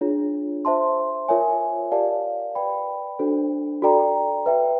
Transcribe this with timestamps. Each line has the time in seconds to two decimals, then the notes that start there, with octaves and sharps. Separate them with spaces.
0.01 D4 F4 G#4 C#5
0.65 C5 E5 A5 C6
1.28 F4 A#4 C#5 E5 G#5
1.92 G4 A#4 D5 F5 A5
2.55 B4 D5 G5 B5
3.19 D4 F#4 A4 C5
3.82 F#4 A4 D5 G5 A#5
4.46 B4 E5 G5